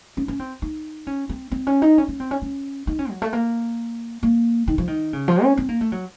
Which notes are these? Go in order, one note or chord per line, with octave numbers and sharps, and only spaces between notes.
C#4
C#4
C4
D#4
C#4
C4
C4
C#4
D#4
C#4
C#4
C4
C#4
C#4
D#4
C#4
F#3
A3
A#3
A#3
D#3
F3
D#3
C#3
F3
C#4
C4
A#3
A3
F#3